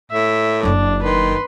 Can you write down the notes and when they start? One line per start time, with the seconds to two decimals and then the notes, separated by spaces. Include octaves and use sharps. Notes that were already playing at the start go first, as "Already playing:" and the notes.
0.11 A2 E5
0.63 F#1 F#2 D4
1.03 D#3 B4 C6